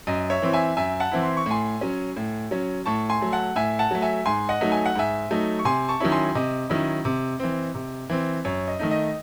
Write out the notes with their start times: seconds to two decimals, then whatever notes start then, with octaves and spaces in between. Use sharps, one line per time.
0.07 F#2 D#5
0.30 C#5 E5
0.42 E3 C4 E4
0.53 E5 G#5
0.77 F#2 E5 G#5
1.00 F#5 A5
1.12 E3 C4 E4
1.23 C6
1.37 C#6
1.46 A2 G#5 C6
1.81 F#3 C#4
2.16 A2
2.51 F#3 C#4
2.86 A2 A5 C#6
3.09 G#5 C6
3.21 F#3 A3
3.32 F#5 A5
3.56 A2 E5 G#5
3.79 F#5 A5
3.91 F#3 A3
4.02 E5 G#5
4.26 G#2 G#5 C6
4.49 D#5 F#5
4.61 F#3 A3 D#4
4.72 G#5
4.86 F#5
4.95 G#2 E5 G#5
5.31 F#3 A3 D#4
5.59 C#6
5.65 C3 G#5 C6
5.89 A5 C#6
6.00 D#3 F#3 C#4 E4
6.12 G#5 C6
6.35 C3 D#5
6.70 D#3 F#3 C#4 E4
7.05 C3
7.40 E3 C4
7.75 C3
8.10 E3 C4
8.45 F#2 C#5
8.68 D#5
8.79 D#3 A3 D#4
8.91 D#5